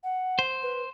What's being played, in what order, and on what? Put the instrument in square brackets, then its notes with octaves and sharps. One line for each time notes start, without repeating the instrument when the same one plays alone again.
[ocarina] F#5
[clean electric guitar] C5
[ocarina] B4